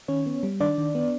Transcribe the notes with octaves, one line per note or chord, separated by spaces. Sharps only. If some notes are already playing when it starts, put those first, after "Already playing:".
D#3 C#4 C#5
B3
G3
D#3 D4 D5
D#3
B3